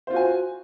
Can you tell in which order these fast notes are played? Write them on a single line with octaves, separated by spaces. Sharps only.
C5 F4 F#4 G#5